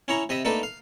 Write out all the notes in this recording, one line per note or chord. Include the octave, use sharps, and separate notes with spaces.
C#4 E4 C#5 A#5
C3 D#5 E5 B5 D#6
A3 A#3 D4 D#4 A4 B4
F5